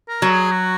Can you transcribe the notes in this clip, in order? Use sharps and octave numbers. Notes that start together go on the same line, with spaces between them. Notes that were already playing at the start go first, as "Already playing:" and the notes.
A#4
F#3
G#4
F#4